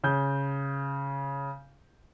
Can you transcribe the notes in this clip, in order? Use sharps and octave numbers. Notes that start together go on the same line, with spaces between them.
C#3 G6